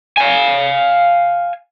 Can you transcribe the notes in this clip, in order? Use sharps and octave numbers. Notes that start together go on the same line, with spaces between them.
F5 G#5